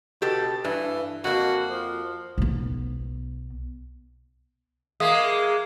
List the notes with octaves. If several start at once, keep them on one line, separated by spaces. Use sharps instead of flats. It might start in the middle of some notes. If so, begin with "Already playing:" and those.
B2 G4 A4
G2 E3
F2 A#3 F#4
F3
B1 B3
G#3 A#3 E5 F5 D#6